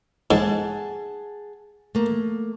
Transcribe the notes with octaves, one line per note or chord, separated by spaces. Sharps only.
G#2 G#4 F#5 A5
A3 A#3